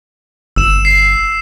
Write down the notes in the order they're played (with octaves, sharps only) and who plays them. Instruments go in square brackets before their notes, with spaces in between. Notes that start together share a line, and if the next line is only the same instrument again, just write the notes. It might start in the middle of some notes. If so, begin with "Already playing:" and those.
[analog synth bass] G1 [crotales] E6 E7
[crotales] C7